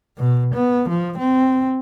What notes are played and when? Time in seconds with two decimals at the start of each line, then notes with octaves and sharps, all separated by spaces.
0.18 B2
0.54 B3
0.89 F3
1.18 C4